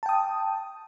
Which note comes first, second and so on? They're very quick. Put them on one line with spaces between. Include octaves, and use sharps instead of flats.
A5 G5 D#6